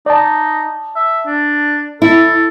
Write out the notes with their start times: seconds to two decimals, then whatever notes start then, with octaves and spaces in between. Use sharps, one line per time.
0.06 D#4 D5 A5
0.96 E5
1.26 D4
2.02 E4 A4